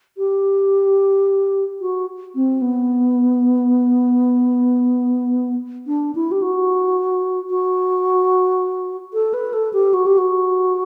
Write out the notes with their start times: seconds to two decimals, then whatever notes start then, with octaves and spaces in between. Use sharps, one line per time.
0.17 G4
1.81 F#4
2.35 C4
2.61 B3
5.87 D4
6.15 E4
6.31 G4
6.42 F#4
7.50 F#4
9.13 A4
9.34 B4
9.53 A4
9.73 G4
9.94 F#4
10.06 G4
10.18 F#4